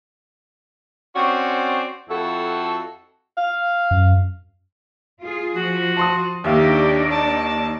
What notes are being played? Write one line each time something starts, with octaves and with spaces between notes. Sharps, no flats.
C4 C#4 F#4 C5 D5
F2 E4 F#4 A4
F5
F#2
F4 G#4
F3 F#4
A5 C6 D#6
D#2 D4 D#4 G4 D5 E5 F5
A5